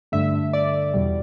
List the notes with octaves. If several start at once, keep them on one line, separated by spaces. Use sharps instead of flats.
G2 D3 A3 E5
D5
E2 B2 G3